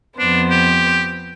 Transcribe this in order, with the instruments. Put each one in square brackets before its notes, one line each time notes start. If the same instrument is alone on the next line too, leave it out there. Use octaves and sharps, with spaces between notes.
[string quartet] F2 B3 C5 [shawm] D4
[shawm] G4